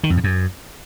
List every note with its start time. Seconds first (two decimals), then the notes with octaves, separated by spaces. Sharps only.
0.04 D#3
0.10 F2
0.17 A2
0.24 F#2